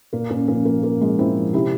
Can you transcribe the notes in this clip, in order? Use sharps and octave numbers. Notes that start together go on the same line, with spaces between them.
A#2 A#3
A#2 A#3 C#4
F3 A#3 C#4
F3 A#3
F3 A#3
F3 G#3
F3 C4 E4
F3
C3 E4 G4